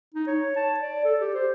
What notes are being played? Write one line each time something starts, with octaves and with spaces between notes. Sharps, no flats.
D#4
C#5
A5
D5
A4
G4
C5